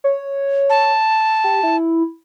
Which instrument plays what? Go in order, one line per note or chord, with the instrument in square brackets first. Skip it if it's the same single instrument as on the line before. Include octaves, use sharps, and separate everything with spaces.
[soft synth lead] C#5
[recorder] A5
[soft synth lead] G4
E4